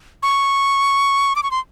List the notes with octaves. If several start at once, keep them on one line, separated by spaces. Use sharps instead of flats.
C#6
D6
C#6
C6